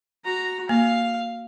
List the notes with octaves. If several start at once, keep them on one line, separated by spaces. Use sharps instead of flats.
F#4 A#5
A#3 F5